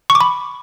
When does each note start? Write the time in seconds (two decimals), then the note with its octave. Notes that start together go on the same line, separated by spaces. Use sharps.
0.10 C#6
0.15 D6
0.21 B5